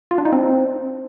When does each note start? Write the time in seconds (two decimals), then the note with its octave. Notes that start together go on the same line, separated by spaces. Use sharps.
0.11 F4
0.18 D4
0.25 D#4
0.32 C4